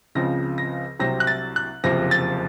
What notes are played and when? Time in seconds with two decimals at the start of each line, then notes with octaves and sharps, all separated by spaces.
0.15 C#2 C#3 F3 C4 A#6
0.58 A#6
0.99 C2 C3 F#3 C4 A#6
1.20 F#6
1.27 A6
1.56 F#6
1.84 F#1 F2 C3 F3 A#6
2.11 A6